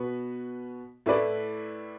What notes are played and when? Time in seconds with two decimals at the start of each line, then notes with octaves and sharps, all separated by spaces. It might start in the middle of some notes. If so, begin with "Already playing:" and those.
Already playing: B2 B3 F#4 B4
1.06 A2 A3 E4 B4 D5